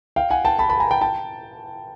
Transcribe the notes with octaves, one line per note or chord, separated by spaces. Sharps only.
F5 G5
F#5 G#5
G5 A5
A5 B5
A5 B5
G#5 A#5
G5 A5
G5 A5